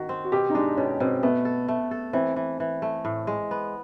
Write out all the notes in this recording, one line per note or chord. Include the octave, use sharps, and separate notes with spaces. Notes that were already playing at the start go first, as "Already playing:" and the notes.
Already playing: D#3 F#4
C4
F#4
B2 G4
D#4
G#3 D4
B2 C#4
B2 C4
A3 B3
A4
A3
A4
E3 C4
E3
E3
A3
A2
G#3
B3